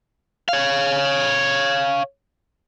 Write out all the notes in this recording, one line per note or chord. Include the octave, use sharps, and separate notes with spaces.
C#5 F5